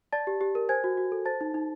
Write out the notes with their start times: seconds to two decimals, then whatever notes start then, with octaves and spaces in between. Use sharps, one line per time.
0.12 D5 A5 A6
0.27 G4
0.41 G4
0.55 A#4
0.69 C5 G#5 G#6
0.84 F#4
0.97 F#4
1.12 A4
1.25 C5 A5 A6
1.41 D#4
1.54 D#4